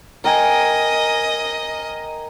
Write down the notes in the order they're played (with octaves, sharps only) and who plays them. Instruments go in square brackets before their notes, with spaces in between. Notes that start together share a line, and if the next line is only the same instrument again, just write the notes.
[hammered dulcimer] A#4 G5 G#5 [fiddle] D#5